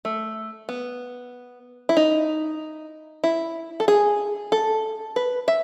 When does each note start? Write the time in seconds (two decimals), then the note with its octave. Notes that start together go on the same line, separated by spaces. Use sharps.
0.05 A3
0.69 B3
1.89 E4
1.97 D#4
3.24 E4
3.80 A4
3.88 G#4
4.52 A4
5.16 B4
5.48 E5